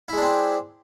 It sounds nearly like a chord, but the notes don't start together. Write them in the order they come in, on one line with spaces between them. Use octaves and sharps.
E4 G#3 D4 C4